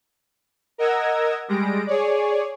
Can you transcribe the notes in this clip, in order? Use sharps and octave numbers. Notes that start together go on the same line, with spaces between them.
A#4 D#5 F#5 E6 G#6 A#6
G3 G#3 A#6 D7
G#4 C#5 D5